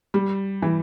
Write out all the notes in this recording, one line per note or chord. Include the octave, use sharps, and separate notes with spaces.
G3
E3